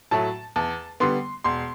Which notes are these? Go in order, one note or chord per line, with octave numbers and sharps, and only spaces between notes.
A2 F#3 A3 A5
E2 A5
D3 G3 B3 C6
E1 C6